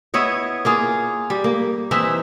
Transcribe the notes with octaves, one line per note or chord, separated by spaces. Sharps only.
B3 E4 C#5 D#5
A#3 F4 G#4
G3
A#3
E3 C4 D#4 E5